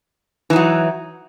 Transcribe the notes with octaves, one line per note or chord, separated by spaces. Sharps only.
E3 F#3 D#4